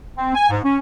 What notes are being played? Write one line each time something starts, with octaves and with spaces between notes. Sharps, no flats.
C4
G#5
G#2
C#4